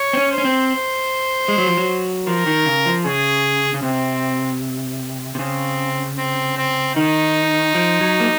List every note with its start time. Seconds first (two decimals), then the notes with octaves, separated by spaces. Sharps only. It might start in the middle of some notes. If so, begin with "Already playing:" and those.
Already playing: C#5
0.13 C4
0.17 C#4
0.31 C5
0.38 C#4
0.45 C4
1.48 G#3
1.58 F#3
1.67 F3
1.77 F#3
2.26 F3 A#4
2.46 D#3
2.66 C#3
2.85 F3
3.04 C#3 G#4
3.74 C#3
3.83 C3 C4
5.35 C3
5.39 C#3 C4
6.18 C4
6.57 C4
6.96 D#3 D#4
7.75 F3
8.01 F#3
8.20 A#3